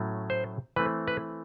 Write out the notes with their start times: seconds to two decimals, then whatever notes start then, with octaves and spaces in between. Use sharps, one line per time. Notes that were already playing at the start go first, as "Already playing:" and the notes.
Already playing: A2 F#3 A3 C#4
0.30 C5
0.76 E3 A3 C4 B4
1.08 B4